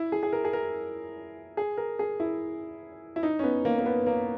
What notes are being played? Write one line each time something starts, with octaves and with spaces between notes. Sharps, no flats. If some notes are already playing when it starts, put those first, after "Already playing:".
Already playing: E4
G#4
G#4
A#4
G#4
A#4
G#4
A#4
G#4
E4
E4
D#4
C#4
B3
A#3
A#3
B3
A#3